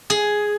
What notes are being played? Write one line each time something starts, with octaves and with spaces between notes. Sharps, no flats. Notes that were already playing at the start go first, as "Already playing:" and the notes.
G#4